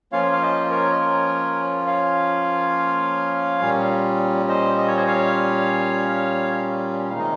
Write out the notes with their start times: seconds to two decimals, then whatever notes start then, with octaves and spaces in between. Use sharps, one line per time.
0.12 F3 A#3 C#4 F4 C#5 F5
0.32 F5
0.42 C5 D#5
0.70 A#4 C#5
0.92 D#5
1.00 A#4 C#5
1.87 C#5 F5
3.61 A#2 G3 C#4
4.49 C5 D#5
4.78 D#5
4.87 C#5
4.96 C5 D#5
5.07 C#5 F5
7.10 C3 D#3 G#3 D#4 F5
7.19 D#5